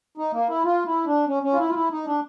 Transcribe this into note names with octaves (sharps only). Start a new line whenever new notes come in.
D#4
A#3
E4
F4
E4
D4
C#4
C#4
F4
E4
F4
E4
D#4
D4